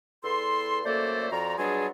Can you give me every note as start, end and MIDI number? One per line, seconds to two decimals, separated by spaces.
0.24 0.80 40
0.24 0.80 69
0.24 0.80 84
0.85 1.27 42
0.85 1.27 57
0.85 1.27 58
0.85 1.27 69
0.85 1.27 72
0.85 1.27 74
1.31 1.56 41
1.31 1.56 53
1.31 1.56 66
1.31 1.56 74
1.31 1.56 82
1.58 1.88 47
1.58 1.88 54
1.58 1.88 55
1.58 1.88 62
1.58 1.88 65
1.58 1.88 68